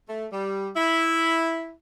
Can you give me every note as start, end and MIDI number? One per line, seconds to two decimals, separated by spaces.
0.08 0.26 57
0.32 0.69 55
0.76 1.70 64